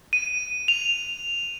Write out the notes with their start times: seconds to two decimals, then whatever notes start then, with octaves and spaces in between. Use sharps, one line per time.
0.13 D#7
0.68 F7